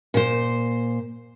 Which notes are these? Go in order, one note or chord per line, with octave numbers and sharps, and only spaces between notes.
A#2 C5